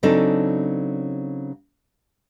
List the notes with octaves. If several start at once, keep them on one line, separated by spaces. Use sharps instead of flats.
C#3 F#3 C4 D4 D#4 A4